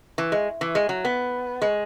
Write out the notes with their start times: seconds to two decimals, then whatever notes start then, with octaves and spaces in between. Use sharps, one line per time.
0.18 E3
0.32 G#3
0.61 E3
0.75 G#3
0.89 F#3
1.05 B3
1.62 G#3